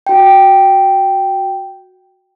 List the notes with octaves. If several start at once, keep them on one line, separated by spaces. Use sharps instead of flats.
F#4 G5